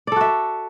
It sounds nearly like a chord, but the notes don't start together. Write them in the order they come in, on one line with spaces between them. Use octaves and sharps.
D5 A4 F#4 E5